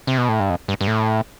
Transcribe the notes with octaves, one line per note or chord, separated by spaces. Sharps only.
C3
B2
A2
G2
F2
G2
G2
A2